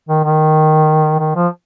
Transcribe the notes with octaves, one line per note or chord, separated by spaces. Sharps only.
D#3
D#3
D#3
F3